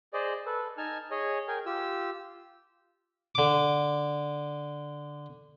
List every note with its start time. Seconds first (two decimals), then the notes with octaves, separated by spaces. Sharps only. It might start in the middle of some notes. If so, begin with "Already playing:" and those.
0.13 G#4 C5 D5 D#5
0.46 A4 B4
0.78 D#4 G#5 A5 F6
1.11 G#4 C#5 D#5
1.48 G#4 A#4 G5 G#5
1.66 F4 G4 E6
3.35 D3 D6